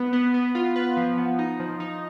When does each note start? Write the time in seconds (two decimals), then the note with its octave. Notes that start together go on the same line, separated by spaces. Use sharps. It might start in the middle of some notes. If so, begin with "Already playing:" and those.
Already playing: B3 B4
0.13 B3
0.34 B3
0.55 F4
0.76 B4
0.97 F3
1.18 B3
1.39 D#4
1.60 F3
1.80 D#4